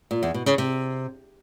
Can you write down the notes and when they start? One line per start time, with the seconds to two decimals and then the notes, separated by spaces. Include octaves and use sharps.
0.11 A#2
0.23 E2
0.34 B2
0.46 C#3
0.58 C3